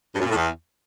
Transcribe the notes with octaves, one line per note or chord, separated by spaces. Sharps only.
G2
F#2
A#2
A2
E2